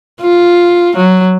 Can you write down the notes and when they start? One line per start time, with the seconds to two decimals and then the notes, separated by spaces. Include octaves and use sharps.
0.21 F4
0.97 F#3